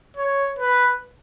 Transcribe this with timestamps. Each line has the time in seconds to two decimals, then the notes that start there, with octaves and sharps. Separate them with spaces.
0.17 C#5
0.59 B4